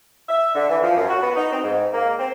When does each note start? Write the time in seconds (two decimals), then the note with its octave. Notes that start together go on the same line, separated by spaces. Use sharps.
0.29 E5
0.55 D3
0.69 E3
0.82 F3
0.97 F#2
1.09 F#4
1.22 B3
1.36 D#4
1.52 C4
1.64 G#2
1.93 A#3
2.19 C4